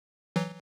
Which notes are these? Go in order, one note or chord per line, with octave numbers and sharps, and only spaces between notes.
E3 F#3